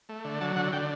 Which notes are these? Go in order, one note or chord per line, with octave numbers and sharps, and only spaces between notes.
A3
D3
F#3 A5
D3 F#5
D3 G5